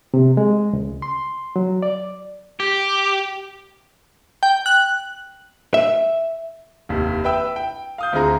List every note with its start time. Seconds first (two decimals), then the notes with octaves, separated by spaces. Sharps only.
0.14 C3
0.37 G#3
0.73 C#2
1.02 C6
1.56 F#3
1.82 D5
2.60 G4
4.43 G5
4.66 F#6
5.74 E5
6.89 F1 D#2
7.24 B4 E5 G5 E6
7.56 G5
7.98 F5 D#6 G6
8.13 D2 C4 F4 G#4 A#5